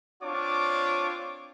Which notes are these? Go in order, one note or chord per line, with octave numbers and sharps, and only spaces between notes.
C4 D4 F4 C#5 A5 D6